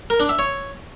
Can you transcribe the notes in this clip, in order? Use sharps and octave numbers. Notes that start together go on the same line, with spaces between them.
A#4
D4
E5
C#5